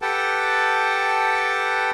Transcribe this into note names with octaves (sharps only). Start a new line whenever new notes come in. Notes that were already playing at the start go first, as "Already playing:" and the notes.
G4 A4 B4 F#5 G5 A5